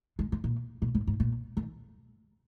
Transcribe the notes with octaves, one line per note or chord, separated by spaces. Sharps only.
G#3
G#3
A#2
A#2
G#2
G#2
A#2
D#3